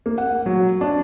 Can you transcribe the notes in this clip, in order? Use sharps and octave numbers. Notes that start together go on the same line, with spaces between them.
A#3
F#5
F#3
D4